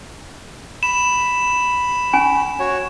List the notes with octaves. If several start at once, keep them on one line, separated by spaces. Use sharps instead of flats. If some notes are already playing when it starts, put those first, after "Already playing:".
B5 E7
C#4 G#5 C#6
F#4 C#5